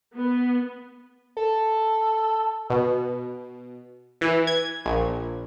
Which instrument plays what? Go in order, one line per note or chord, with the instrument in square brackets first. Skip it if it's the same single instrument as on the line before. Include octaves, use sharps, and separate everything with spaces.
[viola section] B3
[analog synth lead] A4
[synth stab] B2
E3
G#6
A#1